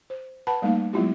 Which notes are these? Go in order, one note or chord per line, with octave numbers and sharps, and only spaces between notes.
C5
B4 F#5 A5 B5
G3 A3 A#3 D#4 F5
F#3 G#3 B3 E4 F4 G4